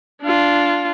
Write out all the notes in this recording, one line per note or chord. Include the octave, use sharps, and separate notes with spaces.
D4 F4